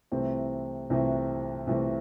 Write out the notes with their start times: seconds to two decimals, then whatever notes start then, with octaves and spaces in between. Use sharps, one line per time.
0.12 C2 C3 E3 A3 C4
0.90 C2 C3 E3 A3 C4
1.67 C2 C3 E3 A3 C4